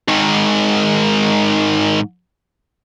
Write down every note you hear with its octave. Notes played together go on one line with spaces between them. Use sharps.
G#2 D#3